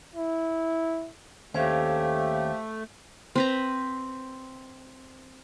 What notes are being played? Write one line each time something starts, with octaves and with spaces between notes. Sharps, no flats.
E4
D#2 A3 C#4 D4 G4 C5 F5
C4 B4 A#5